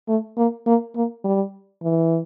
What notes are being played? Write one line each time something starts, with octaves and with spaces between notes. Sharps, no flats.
A3
A#3
A#3
A#3
G3
E3